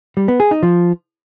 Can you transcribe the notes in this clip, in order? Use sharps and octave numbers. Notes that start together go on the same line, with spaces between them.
G3
B3
G#4
D#4
F3